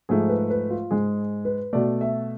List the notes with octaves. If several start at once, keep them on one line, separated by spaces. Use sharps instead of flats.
G#2 F3 A3 G#4
B4
B4
F4
G#2 G#3 G#4
B4
B2 A3 D5
E5